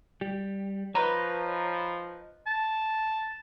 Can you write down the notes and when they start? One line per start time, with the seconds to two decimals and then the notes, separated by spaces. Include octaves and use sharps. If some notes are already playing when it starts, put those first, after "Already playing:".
0.21 G3 G4
0.95 F3 D#4 B4 C#5 A#5 B5
2.47 A5